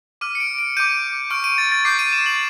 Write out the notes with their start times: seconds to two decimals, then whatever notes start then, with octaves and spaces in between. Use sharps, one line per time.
0.21 D6 F6 D#7
0.35 C#7
0.40 D7
0.59 D7
0.77 D6 G6 D#7
1.30 C#6 F6 D7
1.44 D#7
1.58 A6
1.72 A6
1.85 D6 G6 C7
1.99 D#7
2.13 E7
2.26 F#7